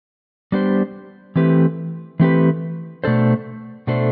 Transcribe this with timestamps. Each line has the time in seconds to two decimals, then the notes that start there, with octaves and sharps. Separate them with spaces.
0.52 G3 B3 D4 G4 C5
1.36 E3 A3 C4 G4 B4
2.20 E3 A3 C4 G4 B4
3.04 B2 A3 D4 A4 C5
3.87 B2 A3 D4 A4 C5